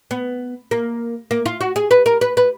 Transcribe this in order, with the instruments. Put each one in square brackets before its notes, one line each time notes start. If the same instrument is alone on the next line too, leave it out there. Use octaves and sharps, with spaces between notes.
[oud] B3
A#3
A#3
F4
F#4
G#4
B4
A#4
B4
B4